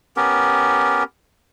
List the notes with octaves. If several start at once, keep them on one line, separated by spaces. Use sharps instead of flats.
B3 C#4 G4 A#4